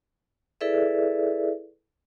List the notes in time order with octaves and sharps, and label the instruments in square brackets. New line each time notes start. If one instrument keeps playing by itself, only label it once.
[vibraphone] E4 G#4 A4 B4 D5 E5